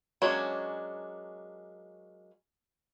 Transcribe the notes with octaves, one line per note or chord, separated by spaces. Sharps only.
F#3 G#3 A#3 C#4 D4